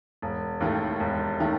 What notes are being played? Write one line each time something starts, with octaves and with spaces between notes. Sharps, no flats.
E1
D#2 D#3 A3 E4
E1
D#3 A3 E4